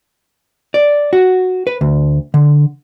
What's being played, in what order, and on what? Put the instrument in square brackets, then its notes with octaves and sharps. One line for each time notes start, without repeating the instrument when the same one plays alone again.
[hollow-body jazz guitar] D5
F#4
B4
D2
D3